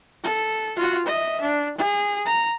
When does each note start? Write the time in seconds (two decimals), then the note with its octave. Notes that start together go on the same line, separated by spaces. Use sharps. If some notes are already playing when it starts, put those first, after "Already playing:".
0.23 A4
0.76 F4 F#4
1.06 D#5 E5
1.41 D4
1.78 G#4
2.25 A#5